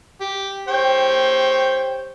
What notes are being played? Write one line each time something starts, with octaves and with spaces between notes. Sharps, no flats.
G4
G4 C5 C#5 G5